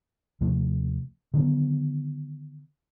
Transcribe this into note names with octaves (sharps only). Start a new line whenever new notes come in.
D#2 C3 F3 A3
D3 D#3 F#3 B3